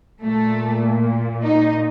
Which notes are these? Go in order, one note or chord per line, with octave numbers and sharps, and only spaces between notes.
A#2 A3
D#4